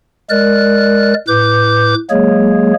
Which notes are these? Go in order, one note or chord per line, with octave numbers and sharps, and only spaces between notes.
G#3 A#4 D5 F#6
A2 B4 D6 G6
F#3 G#3 A#3 G#4 C#5